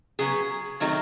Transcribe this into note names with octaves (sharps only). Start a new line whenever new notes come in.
C#3 F#3 B3 G#4
D#3 F#3 A3 C4 D#4